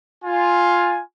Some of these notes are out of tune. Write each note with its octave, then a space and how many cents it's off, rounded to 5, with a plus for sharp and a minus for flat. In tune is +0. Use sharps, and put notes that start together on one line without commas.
F4 +5 G#5 +0